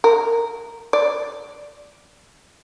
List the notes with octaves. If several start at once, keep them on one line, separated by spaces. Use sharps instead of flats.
A#4
D5